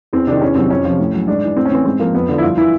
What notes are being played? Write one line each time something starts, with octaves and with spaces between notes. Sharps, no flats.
E2 C4
C3 D#3 D4
E2 C#4
C3 D#3 F#3 C4
F2 C#4
C3 F3
A2
F#3
G#2 D4
E3
A2 C4
C#4
E3 C4
G#2 C4
F3 A#3
F2 B3
D3 F3
E4
G2 F4
E3 E4